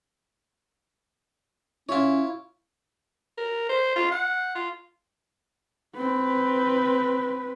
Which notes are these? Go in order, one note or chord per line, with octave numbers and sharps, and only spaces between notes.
C#4 E4 F4 C#5
A#4
C5
F4
F#5
F4
C4 B4